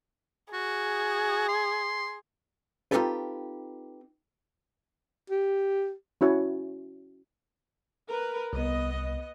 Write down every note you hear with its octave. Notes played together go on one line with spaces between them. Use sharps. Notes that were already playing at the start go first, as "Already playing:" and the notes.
F#4 G#4
C6
C4 D#4 F4 G4 A4 B4
G4
C#4 E4 F#4 C#5
A#4 B4
C2 B3 D#5